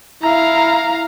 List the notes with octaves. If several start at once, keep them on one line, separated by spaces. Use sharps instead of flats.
E4 F5 A#5